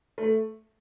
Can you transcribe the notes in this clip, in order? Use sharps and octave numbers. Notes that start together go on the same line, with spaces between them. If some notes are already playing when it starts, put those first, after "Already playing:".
A3